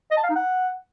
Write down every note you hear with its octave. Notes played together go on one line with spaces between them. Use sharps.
D#5
A5
F5
D#4
F#5